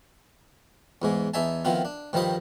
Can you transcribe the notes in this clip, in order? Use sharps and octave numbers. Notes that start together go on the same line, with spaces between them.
E2 G#2 G#3
E2 D#4 E5 G#5 A5
D#3 F3 B3 C4 E4 F4
D4
G2 D#3 F3 G3 C5 D#5